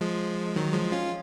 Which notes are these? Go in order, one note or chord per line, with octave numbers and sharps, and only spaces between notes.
F3 G#3
D#3 F#3
F3 G#3
C#4 F4